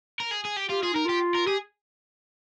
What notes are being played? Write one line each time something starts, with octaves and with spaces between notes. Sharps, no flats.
A#4
G#4
G#4
G4
F4 G4
F4 G#4
D#4 A#4
F4 G4
A#4
G4 G#4